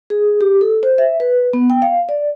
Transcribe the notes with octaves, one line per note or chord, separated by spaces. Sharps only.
G#4
G4
A4
C5
E5
B4
B3
G5
F5
D5